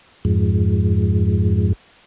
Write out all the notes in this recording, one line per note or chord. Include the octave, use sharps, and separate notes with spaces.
F2 G#2